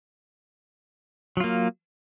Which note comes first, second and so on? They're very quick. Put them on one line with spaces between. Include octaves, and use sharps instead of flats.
F#3 F4 A#3